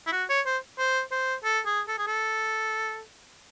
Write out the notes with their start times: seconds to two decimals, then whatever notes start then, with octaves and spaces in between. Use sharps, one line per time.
0.07 E4
0.12 F#4
0.29 C#5
0.46 C5
0.78 C5
1.12 C5
1.44 A4
1.66 G#4
1.88 A4
1.98 G#4
2.07 A4